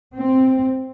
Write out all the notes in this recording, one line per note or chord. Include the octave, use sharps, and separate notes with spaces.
C4